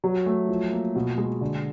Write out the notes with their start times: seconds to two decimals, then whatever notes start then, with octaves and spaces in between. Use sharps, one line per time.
0.04 F#3
0.26 A3
0.49 F3
0.72 A#3
0.96 B2
1.18 G#3
1.41 D3